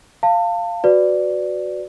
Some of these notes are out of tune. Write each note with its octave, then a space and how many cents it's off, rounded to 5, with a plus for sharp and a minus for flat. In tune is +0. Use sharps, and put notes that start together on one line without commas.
F5 -5 A5 +30
F#4 +0 B4 +20 D5 +0